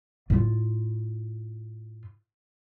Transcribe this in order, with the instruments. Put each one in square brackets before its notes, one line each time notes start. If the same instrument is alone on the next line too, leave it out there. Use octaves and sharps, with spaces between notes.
[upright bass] A2 F4